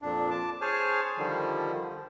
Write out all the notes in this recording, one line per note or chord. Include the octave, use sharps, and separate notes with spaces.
F2 A#2 D4
A5 D6
G#4 C5 C#5 G#5 A5 F6
D3 D#3 F3 G3